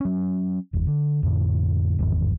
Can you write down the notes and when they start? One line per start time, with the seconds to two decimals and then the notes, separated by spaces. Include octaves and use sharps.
0.01 F#3 C#4
0.73 F#1 E2
0.87 D3
1.23 F2 A2 D3
1.99 G1 E2 G#2 D#3